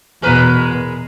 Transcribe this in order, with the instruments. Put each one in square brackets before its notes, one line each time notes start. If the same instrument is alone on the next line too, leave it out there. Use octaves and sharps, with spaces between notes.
[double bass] E2 B2 [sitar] G#3 A#4 B4